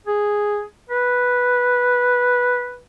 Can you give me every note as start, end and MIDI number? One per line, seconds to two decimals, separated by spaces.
0.06 0.63 68
0.89 2.79 71